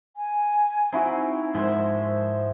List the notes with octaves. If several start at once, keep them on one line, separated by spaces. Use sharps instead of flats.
G#5
C4 D#4 E4 F#4
G#2 F3 G#3 A#4 C5 E5